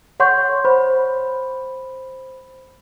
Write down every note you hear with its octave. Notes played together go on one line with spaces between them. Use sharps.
C#5 F#5 C6 C#6 G6
C5 B5